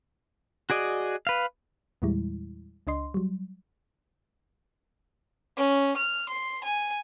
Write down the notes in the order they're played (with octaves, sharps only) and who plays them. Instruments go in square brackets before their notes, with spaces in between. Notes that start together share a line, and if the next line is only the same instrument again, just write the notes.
[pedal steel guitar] F#4 G#4 D5 D#5
B4 F5
[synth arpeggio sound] E2 A#2 E3 G3 G#3 E4
C#2 D4 D#5 C6
F#3 G3
[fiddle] C#4
F6
C6
G#5